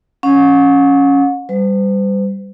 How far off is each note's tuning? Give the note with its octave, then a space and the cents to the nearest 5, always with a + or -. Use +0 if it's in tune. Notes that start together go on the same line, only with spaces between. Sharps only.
C#4 +0 F#5 -40
G3 +0 C5 -45